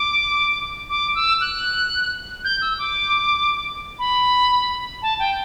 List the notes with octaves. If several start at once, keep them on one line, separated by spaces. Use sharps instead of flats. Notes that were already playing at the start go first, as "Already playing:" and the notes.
Already playing: D6
D6
E6
F#6
G6
E6
D6
B5
A5
G5